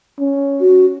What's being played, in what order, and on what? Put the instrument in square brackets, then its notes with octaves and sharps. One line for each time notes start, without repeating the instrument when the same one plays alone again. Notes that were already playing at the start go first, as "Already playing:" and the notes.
[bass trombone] C#4
[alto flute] F#4